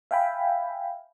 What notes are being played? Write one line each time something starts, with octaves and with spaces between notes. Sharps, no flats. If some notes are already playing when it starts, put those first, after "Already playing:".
E5 F5 G5 G#5 B5